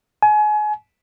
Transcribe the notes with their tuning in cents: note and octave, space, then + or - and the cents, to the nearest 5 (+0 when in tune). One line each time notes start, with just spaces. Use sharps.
G#5 +30